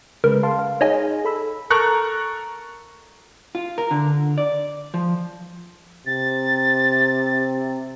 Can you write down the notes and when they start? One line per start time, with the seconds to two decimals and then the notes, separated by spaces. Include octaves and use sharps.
0.24 C#3 G#3 A#4 B4
0.43 F5 A5 C6
0.59 F5
0.81 D#4 G#4 C#5 D#5 G#5
1.25 A4 B5 E6
1.70 A4 A#4 A#5 C#6 F#6
3.55 F4
3.78 A#4
3.91 D3
4.38 D5
4.94 F3
6.06 C3 A6